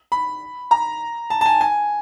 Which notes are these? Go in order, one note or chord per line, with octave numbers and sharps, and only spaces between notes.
B5
A#5
A5
A5
G#5
G#5